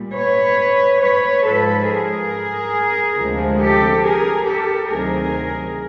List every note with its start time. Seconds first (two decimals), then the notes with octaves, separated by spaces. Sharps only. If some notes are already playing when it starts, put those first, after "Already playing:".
Already playing: A#2 G3
0.14 B4 C#5
1.00 B4 C#5
1.44 G#2 F3 G#3 A4 B4
1.87 G#4 A#4
3.17 D2 C3 F3 G#3
3.60 G4 A4
4.04 G#4 A#4
4.47 G4 A4
4.90 D2 C3 D#3 F#3 G#4 A#4